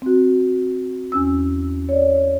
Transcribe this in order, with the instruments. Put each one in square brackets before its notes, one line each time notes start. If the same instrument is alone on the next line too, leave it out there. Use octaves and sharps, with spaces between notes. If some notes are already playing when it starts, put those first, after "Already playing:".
[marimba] C4 F#4
E2 C#4 E6
C#5 D5